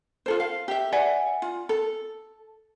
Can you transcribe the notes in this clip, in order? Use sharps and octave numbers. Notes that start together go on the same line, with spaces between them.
F4 A4 C5
F5
G4 E5
D5 E5 F#5 G#5
F4
A4